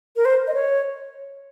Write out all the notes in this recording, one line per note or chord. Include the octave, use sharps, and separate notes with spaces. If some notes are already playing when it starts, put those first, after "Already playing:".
A#4
C5
D#5
C#5